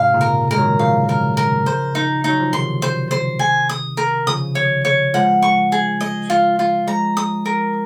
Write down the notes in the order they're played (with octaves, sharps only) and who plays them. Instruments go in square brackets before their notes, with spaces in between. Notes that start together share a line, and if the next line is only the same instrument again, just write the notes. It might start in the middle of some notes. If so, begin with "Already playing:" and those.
Already playing: [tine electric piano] G#2 C3 [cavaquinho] F5
[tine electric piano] A#2 C#3
[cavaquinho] A#4
[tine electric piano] G#3 [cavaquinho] A#4
[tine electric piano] D#3 F#3
[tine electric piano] C#3 F3 [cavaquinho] F5
[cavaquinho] A#4
A#4
C5
D#4
[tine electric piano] F#3 [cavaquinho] D#4
[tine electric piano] F3
[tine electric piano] C3 D#3 [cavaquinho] C6
[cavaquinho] C5
C5
G#5
D#6
A#4
[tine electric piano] C#3 F3 [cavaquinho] D#6
[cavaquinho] C#5
C#5
[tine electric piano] F3 G#3 [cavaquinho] F#5
[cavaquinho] C#6
G#4
D#5
F4
F4
[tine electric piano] F3 G#3 [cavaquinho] A#5
[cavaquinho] D#6
A#4